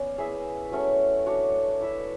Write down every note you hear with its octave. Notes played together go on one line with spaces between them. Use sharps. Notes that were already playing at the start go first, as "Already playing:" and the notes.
Already playing: B3 C#4 D5
E4 G#4 B4 E5
F#3 A3 C#4
D4 F#4 C#5
E4 B4 E5